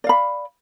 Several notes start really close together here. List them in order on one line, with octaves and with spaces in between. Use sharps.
D5 F5 B5